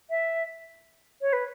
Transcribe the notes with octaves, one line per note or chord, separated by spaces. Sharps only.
E5
C#5
B4